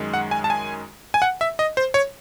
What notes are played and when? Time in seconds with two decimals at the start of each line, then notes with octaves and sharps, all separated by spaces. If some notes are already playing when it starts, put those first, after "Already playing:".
Already playing: F#2 D#3 G#3
0.14 F#5
0.31 G#5
0.44 A5
0.50 G#5
1.14 G#5
1.22 F#5
1.41 E5
1.59 D#5
1.77 C5
1.94 C#5